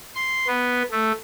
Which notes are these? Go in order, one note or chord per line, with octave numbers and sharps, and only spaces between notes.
C6
B3
A3